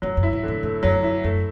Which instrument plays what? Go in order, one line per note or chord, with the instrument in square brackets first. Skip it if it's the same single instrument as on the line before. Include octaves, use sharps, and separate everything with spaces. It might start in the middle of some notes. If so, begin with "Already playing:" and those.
[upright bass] F#2 [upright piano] F#3
[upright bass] F#2
[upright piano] E4
[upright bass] G#2
[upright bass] A2 [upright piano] D3
[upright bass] G#2 [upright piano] A3
[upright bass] F#2 [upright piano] F#3
[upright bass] F#2 [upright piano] E4
[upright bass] F#2 [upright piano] A3